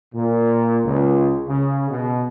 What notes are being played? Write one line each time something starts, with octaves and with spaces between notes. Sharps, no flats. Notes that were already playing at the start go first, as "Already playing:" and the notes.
A#2
C#2
C#3
B2